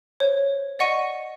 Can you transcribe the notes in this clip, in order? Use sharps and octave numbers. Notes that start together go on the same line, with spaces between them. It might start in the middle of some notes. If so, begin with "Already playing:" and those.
C5 C#5
D5 D#5 F#5 C#6 A#6 D#7